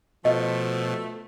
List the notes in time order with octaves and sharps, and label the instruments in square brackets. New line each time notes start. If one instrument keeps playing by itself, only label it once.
[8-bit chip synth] B2 [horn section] F3 [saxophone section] A3 [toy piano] D#5